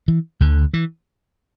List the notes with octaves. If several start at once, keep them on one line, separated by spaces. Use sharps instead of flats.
E3
D2 D3
E3